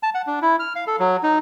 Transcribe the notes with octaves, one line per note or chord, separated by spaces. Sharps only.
A5
F#5
D4
E4
F6
F5
A4
F#3
D#4